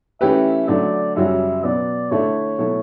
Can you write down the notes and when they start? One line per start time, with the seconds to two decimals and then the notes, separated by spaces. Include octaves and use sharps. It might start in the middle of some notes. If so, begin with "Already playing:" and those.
0.21 E3 A3 C#4 G4 B4 E5
0.68 D3 F#3 A3 D5
1.16 F#2 C#3 G3 C#4 F#4 E5
1.63 B2 F#3 B3 D5
2.11 D3 A3 E4 A4 C#5
2.58 B2 F#3 A3 E4 A4